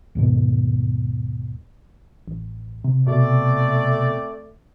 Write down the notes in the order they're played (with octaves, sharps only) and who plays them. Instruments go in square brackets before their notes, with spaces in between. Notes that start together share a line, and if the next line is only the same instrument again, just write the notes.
[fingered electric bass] D#2 G#2 B2
[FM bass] A1
[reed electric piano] C3
[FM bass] B2 [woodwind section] A3 C4 D5